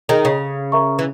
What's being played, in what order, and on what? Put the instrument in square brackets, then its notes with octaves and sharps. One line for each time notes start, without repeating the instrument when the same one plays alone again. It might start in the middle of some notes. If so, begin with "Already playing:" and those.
[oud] D#3 [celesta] G#4 D#5 G5 A#5
[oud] C#3
[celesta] A#4 E5 A#5 C#6
[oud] E3